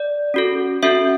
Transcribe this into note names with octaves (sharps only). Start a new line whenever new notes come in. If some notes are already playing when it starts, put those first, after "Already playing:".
Already playing: D5
C#4 F#4 A4
C#4 F#4 A4 E5